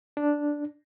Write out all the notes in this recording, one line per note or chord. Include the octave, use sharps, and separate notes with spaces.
D4